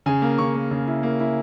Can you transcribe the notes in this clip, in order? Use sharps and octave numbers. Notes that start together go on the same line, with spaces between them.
C#3 G#5
A#3
C#3 C#6
A#3
C#3
E4
A#3
E4